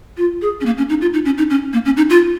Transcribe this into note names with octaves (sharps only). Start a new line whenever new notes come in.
F4
G#4
C#4
A#3
C#4
D#4
F4
D#4
C#4
D#4
C#4
A#3
C#4
D#4
F4